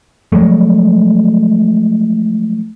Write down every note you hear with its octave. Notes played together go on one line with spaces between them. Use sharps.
F3 F#3 G#3 A3